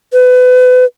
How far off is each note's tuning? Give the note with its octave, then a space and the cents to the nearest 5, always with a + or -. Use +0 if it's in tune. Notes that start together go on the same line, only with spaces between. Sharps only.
B4 +30